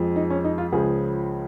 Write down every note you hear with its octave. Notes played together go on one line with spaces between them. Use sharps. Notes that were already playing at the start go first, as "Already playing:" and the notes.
Already playing: F2 F3 G#3
D#4
C#4
D#4
F4
C#2 C#3 F3 G#4